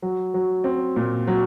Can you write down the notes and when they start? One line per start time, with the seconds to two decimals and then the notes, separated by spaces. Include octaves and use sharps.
0.02 F#3
0.34 F#3
0.64 C4
0.96 A#2
1.27 F#3